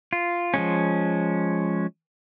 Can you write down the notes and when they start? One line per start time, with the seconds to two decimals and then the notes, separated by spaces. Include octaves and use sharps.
0.13 F4
0.54 F3 G#3 C#4